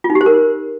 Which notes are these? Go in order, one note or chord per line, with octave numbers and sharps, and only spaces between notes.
F4
D#4
G4
C5
A#4